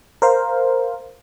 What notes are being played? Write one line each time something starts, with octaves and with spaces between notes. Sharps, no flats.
A#4 C5 F5